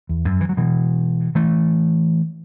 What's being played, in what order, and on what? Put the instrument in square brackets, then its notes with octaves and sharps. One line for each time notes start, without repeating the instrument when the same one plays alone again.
[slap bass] E2
F#2
E3
F#3
B2 E3
E3 A3